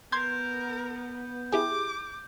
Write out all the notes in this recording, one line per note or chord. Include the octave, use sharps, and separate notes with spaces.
B3 A#4 C6 G6 G#6
E4 G4 G#4 D6